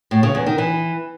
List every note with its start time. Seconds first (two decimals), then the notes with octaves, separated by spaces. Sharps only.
0.11 A2
0.23 C#3
0.35 E2
0.46 D#3
0.58 E3